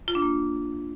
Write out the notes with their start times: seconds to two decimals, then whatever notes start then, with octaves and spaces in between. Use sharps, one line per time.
0.08 F4
0.15 D4
0.22 A#3